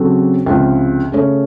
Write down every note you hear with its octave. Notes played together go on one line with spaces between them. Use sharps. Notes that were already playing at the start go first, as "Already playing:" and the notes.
Already playing: C#3 F#3 C4 F#4 A4
C#2 C3 F3
C#3 A3 C#4